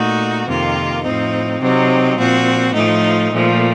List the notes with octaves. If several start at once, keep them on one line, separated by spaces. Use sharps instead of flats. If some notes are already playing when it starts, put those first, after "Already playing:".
Already playing: A#2 A3 D#4 F#4
F2 C3 D#3 A#3 F4
A2 F3 C4 D#4
C3 F#3 C4 D#4
A#2 F3 C4 F#4
A2 F3 A3 D#4
A#2 F3 A3